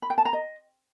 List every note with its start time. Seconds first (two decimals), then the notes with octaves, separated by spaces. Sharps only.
0.02 B5
0.10 G5
0.18 A5
0.25 A#5
0.33 D#5